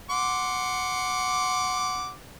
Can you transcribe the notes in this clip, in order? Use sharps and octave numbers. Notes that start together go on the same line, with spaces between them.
F#5 C6 D6